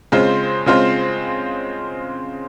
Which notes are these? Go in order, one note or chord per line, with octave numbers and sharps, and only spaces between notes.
C#3 G#3 C4 F4 C5
C#3 G#3 C4 F4 C5